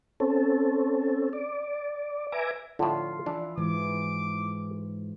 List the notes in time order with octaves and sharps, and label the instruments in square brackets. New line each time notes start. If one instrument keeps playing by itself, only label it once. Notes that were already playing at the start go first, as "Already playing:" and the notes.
[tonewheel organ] C4 C#4 A4
D5
B4 E5 G#5 A#5 D6
[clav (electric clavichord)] A2 D3 [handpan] F4
[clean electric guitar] E3 E4 [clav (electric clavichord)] D4
[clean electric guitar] G#2 [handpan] E3 [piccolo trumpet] D6